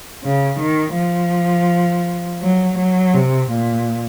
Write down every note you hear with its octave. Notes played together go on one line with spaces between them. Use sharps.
C#3
D#3
F3
F#3
F#3
C3
A#2